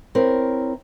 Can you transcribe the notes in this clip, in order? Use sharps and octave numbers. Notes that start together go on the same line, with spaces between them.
C4 E4 A#4 C#5